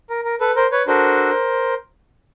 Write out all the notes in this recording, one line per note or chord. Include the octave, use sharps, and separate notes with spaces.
A#4
A#4
A4 B4
A#4 C5
B4 C#5
D4 F#4 A4 A#4 C5